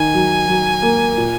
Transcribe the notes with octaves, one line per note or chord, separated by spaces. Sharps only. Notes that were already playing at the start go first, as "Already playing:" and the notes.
Already playing: D#3 G#5
F#3
F#3
A#3
A#2